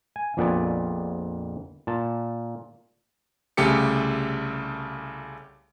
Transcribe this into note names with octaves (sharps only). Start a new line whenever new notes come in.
G#5
A#1 F2 A#2 B3 D5 G#5
A#2 A5
C2 C#3 A3 G4 A4 C#7